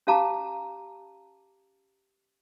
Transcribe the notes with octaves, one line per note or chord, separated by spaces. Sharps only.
C#4 G4 F5 A5 A#5 D6